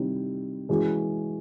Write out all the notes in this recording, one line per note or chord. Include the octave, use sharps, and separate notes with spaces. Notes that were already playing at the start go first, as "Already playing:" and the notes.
Already playing: C3 D#3 G3 C4 E4
E3 G#3 C#4 F#4